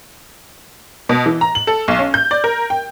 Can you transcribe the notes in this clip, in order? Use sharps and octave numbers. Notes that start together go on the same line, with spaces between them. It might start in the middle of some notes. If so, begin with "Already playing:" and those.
B2
E3
A#5
F#7
A4
B1
C#4
G6
D5
A#4
G5